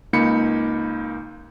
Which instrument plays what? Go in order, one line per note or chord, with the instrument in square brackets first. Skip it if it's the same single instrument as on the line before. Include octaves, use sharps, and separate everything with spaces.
[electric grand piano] C#2 A#3 D#4 B5 C#7